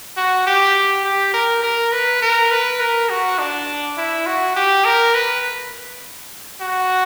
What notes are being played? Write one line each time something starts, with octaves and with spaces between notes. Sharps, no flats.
F#4
G4
G4
A#4
A#4
B4
A#4
B4
A#4
F#4
D4
E4
F#4
G4
A#4
B4
F#4